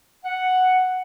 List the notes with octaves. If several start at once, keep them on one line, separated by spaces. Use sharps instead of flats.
F#5